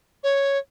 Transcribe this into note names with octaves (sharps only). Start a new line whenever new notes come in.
C#5